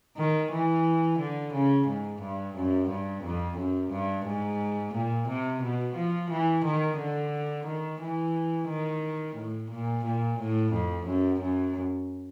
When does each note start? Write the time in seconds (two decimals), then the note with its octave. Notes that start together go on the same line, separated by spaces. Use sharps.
0.17 D#3
0.52 E3
1.19 D3
1.53 C#3
1.88 G#2
2.21 G2
2.56 F#2
2.89 G2
3.24 F2
3.57 F#2
3.91 G2
4.26 G#2
4.94 A#2
5.28 C3
5.63 B2
5.95 F3
6.30 E3
6.65 D#3
6.99 D3
7.66 D#3
8.01 E3
8.68 D#3
9.36 A2
9.71 A#2
10.05 A#2
10.39 A2
10.73 F2
11.06 F#2
11.40 F#2